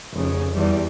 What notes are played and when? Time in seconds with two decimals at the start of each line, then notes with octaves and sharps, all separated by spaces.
0.12 F1 C#3
0.54 E2 G3